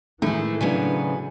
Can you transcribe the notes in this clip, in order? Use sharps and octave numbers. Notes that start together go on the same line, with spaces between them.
A2 D#3 E3 G#3 A3 G#4
G#2 C#3 F#3 D4 B4 G#5